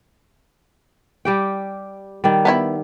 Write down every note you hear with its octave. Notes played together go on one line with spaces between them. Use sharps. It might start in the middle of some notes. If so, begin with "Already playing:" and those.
G3 G4 G5
D#3 G3
B3 C#4 E4